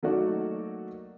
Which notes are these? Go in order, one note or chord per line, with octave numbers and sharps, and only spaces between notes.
F#3 A3 A#3 D#4 F#4 D5